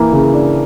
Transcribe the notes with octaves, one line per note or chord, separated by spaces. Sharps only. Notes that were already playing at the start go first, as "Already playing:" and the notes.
Already playing: E3 A#3
C#3
D4